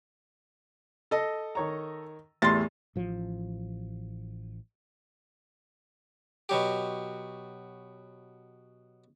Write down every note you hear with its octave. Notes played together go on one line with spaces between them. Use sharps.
A4 D#5
D#3 C#5 A#5
E2 A2 G3 C6 A6
A1 F3
B2 F#3 G4